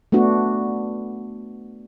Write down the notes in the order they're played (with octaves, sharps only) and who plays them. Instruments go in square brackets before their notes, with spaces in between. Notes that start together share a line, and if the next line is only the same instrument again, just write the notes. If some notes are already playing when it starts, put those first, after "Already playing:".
[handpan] A3 B3 D4 F#4